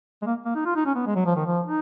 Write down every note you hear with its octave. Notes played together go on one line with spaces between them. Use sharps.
G#3
A#3
A#3
D#4
F4
D#4
C#4
B3
G#3
F#3
F3
D#3
F3
D#4